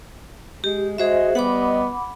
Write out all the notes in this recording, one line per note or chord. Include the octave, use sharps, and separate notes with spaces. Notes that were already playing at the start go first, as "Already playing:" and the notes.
G#3 G4
G#3 F#4 G#4 C5 D#5 E5
G3 B3 D#5 F#5 B5 D6